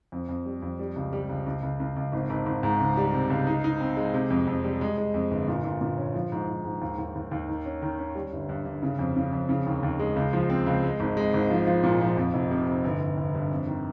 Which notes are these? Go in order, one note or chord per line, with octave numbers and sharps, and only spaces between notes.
F2
F2
G3
F2
G3
C#2
G3
C#2
C#2
C#2
C#2
C#2
G#1
G#1
G#1
G#2
C#2
G3
C3
C#2
D#4
D#4
C4
G#3
C3
F2
F2
G3
G#3
G#3
F2
G1
A#2
A#2
A#2
C#4
F3
G#2
G#2
G#2
D#2
D#2
D#2
D#2
D#3
C#4
D#3
C#4
G3
G1
G2
G2
C#3
F2
C#3
F2
C#3
D#2
D#2
G#3
C#2
F3
C4
C#2
G#3
G#1
G#3
G#1
F3
F3
A#2
F3
F2
F1
C3
C3
G1
G1
G1
G2
F2
D#3